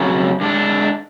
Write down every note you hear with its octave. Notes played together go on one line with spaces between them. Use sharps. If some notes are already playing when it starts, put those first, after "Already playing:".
Already playing: F2 C#3 F#3
D3 G#3 D4